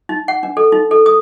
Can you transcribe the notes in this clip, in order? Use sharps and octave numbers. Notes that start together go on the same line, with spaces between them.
D#4
F#5
D4
A4
D#4
A4
D#6